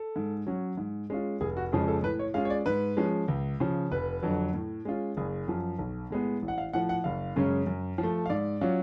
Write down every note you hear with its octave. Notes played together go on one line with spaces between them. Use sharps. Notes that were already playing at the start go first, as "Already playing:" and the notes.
Already playing: A4
G#2
F#3 C#4
G#2
G#3 C#4 F4
F1 G#4
F#4
F2 C#3 F3 G#3 G#4
A4
A2 B4
C#5
G#3 C#4 F4 F5
C#5
D5
G#2 B4
F3 G#3 C#4
C#2
C#3 F3
F1 B4
F2 D3 F#3
A2
G#3 C#4 F4
F#1 G#4
F#2 F3
B1
A2 G#3 B3
A1
F#5
F5
A2 F3 F#5
F#5
F#1 F5
F#2 C#3 G#3 C#4
F#2
F3
A3
F5
G#2 D5
F#3 C#4 F4